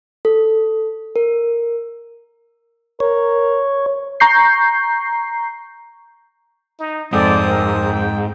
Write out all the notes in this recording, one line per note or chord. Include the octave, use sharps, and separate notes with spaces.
A4
A#4
A#4 C#5
A#5 C#6 G6 C7
D#4
F2 G#2 C4 A4 C5 D5 D#6
A#4
G5